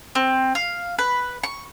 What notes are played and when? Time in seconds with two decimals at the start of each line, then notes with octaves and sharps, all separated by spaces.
0.15 C4
0.55 F5
0.99 B4
1.43 C#6